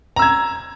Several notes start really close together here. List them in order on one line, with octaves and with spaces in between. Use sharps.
A#5 E6 G#6